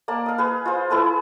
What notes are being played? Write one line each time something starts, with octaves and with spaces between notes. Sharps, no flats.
A#3 D5 A5
D#5 F5
G#4 B4
F4 C5
E4 G#4 B4 A5